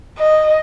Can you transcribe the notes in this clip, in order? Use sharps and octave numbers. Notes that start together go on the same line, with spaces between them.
D#5